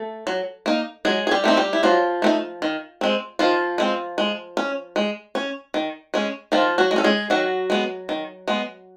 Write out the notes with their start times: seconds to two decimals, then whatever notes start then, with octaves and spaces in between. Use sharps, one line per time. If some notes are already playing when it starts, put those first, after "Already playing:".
Already playing: A3 A4
0.27 F#3
0.66 A#3 D#4
1.05 F#3 G#3 G#4
1.27 G#4
1.31 G3 G4
1.44 A3 C4 D#4
1.57 G3 G4
1.73 E4
1.83 F3 F#3 F4
2.22 A3 C4 D#4
2.62 D#3
3.01 G#3 C4
3.39 D#3 F3 F4
3.78 G#3 C4
4.18 G#3
4.57 C#4
4.96 G#3
5.35 C#4
5.74 D#3
6.14 G#3 C#4
6.52 D#3 F3 F4
6.78 F#3 F#4
6.91 G#3
6.96 C#4 A4
7.04 G#3 G#4
7.30 D#3 F#3 F#4
7.70 G#3 B3
8.09 D#3
8.48 G#3 B3